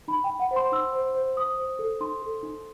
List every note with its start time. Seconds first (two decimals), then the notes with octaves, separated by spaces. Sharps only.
0.08 D#4 B5
0.24 D#4 G5
0.40 F#5
0.51 C5
0.56 C6
0.72 D#4 E6
0.93 C5
1.15 C5
1.37 C5 D#6
1.57 C5
1.79 A4
2.00 D#4 C6
2.22 A4
2.43 D#4